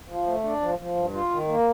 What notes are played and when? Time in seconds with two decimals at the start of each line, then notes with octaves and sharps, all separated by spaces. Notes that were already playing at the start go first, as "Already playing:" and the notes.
0.08 F3
0.26 A3
0.44 D4
0.61 F3
0.79 F3
0.96 G2
1.13 F4
1.31 D#3
1.48 A#3